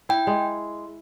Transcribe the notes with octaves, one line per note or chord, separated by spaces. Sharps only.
E4 G5
G#3